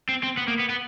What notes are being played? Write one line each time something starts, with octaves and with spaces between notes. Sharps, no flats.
C4
C4
B3
A#3
B3
B3